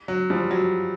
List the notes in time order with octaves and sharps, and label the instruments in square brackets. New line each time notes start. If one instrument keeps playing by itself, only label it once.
[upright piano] F#3
F3 G3
F#3